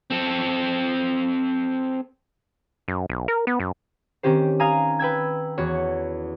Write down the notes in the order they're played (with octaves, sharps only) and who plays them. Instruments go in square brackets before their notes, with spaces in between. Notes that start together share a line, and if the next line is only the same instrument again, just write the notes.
[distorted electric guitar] C4 A4
[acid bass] F#2
B1
A#4
B3
F#2
[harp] D#3 C4 C#4 G4 C5
F5 G#5 A#5 D#6
B4 G5 E6 G#6
E2 F#4 C#5 C#6